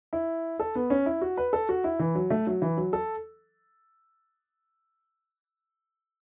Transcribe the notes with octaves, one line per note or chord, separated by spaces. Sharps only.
E4
A4
B3
C#4
E4
F#4
B4
A4
F#4
E4
E3
F#3
A3
F#3
E3
F#3
A4